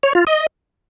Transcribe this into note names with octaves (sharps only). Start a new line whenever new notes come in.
C#5
F4
D#5